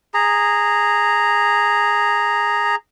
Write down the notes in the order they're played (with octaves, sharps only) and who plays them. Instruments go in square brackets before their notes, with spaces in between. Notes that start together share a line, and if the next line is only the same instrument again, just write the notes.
[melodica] G#4 A#5